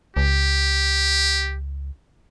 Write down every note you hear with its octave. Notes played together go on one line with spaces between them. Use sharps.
C#2 G4